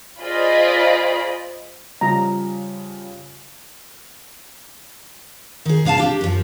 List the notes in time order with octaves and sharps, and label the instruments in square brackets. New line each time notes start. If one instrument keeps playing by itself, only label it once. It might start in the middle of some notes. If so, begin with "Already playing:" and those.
[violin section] F4 G#4 C5 D5 D#5 B5
[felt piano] C#3 F3 G3 [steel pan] A#5
[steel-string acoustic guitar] D#3 G#4
C3 A#3 F5 G#5 A5
D4 G4
F#2 F3